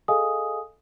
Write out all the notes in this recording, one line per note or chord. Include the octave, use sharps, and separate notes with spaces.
G#4 A4 D#5 F5 G#5 D#6